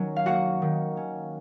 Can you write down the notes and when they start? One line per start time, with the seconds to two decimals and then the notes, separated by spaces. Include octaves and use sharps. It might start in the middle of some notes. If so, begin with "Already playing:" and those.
Already playing: D#3 F#3 C#4
0.16 F5
0.26 A#3 F#4 F#5
0.62 D#3
0.97 C#4